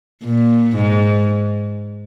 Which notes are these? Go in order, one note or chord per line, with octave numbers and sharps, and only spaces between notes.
A#2
G#2